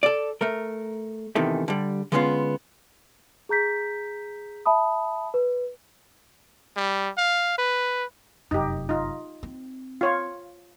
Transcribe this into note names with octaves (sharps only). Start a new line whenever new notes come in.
A4 D5
A3 A#4
E2 C3 D#3 E3 A3
D3 G3
D3 G#3 B3 C#4 D4 F4
G#4 A#5 G6 B6
E5 A5 B5 D#6
B4
G3
F5
B4
F1 F#2 D#4 G4
D#4 F4
C4
F4 C#5 F5